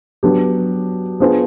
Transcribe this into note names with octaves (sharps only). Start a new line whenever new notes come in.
F#3 B3 D4 G4
B3 D4 F4 G#4 C5